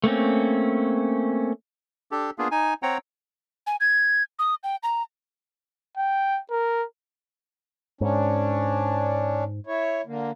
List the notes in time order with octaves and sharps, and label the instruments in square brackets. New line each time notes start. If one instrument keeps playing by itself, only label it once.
[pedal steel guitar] A3 A#3 C4 C#4
[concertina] D4 G4 A4
A#3 B3 D4 F4 G#4
D#4 G#5
C4 C#5 F#5 G5 A#5
[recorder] G#5
G#6
D#6
G5
A#5
[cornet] G5
A#4
[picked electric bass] G#2 [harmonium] C#4 D4
[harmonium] E4 C#5
D3 A#3